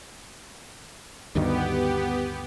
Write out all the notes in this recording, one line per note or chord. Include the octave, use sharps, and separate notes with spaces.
D2 G2 D#3 B3 G4